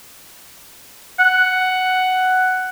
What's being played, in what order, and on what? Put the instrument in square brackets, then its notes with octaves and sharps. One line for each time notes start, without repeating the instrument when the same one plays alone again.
[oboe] F#5